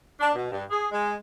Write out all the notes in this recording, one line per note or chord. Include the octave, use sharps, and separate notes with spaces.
D4
B2
G2
G#4
G#3